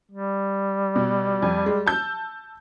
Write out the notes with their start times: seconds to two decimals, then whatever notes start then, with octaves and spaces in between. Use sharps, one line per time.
0.11 G3
0.96 B2
1.42 F2
1.66 G#3
1.86 A5 E6 G6